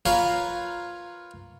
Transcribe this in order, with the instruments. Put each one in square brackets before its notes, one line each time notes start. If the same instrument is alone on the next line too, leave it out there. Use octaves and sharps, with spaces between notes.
[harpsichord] F4 A#4 B4 C#5 F5